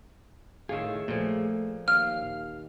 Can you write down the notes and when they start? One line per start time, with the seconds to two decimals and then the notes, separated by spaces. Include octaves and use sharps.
0.69 A2 D#3 F4 G#4 C#5 E5
1.08 A#2 F3 A3
1.88 D#2 F5 F6